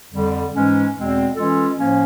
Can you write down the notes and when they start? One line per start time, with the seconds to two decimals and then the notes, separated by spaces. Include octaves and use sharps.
0.12 F2 D3 G3
0.53 G#2 E3 G#3 C#4
0.94 E2 B2 G#3 C4
1.35 E3 G#3 C#4 F4 A4
1.76 A2 F3 A#3 C#4